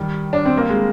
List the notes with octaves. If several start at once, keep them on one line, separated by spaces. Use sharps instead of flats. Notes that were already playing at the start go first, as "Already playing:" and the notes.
Already playing: D#3 G3
D4
C4
A#3
G#3